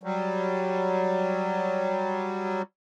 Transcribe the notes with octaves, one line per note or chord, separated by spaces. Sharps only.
F#3 G3